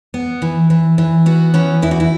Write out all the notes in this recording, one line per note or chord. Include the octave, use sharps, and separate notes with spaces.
B3
E3
E3
E3
B3 F#4
E3 C#4
E2 E4
F#4
E4